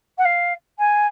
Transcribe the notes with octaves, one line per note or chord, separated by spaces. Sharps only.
F#5
F5
G#5